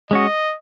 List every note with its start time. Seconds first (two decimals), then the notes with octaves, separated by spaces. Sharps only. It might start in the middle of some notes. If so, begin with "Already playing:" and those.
0.11 G#3 C#4 F#4 D#5